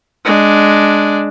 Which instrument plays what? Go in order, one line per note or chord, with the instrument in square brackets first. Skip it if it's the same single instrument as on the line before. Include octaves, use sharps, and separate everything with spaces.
[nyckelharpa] G#3 D4